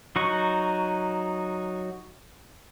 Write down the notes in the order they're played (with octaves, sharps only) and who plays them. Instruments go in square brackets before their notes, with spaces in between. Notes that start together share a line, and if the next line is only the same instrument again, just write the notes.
[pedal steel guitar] F#3 D#4 F#4 C#6